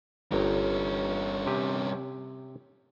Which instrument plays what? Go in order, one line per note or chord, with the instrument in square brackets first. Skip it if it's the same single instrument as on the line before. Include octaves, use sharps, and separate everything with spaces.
[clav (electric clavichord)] G1 G5 A#5 [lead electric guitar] G2 C#4
[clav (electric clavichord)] C3 G4 G#5